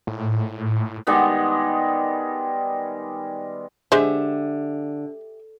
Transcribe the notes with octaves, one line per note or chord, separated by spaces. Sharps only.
A2
D#3 G3 G#3 B3
D3 G#3 G4 C5 E5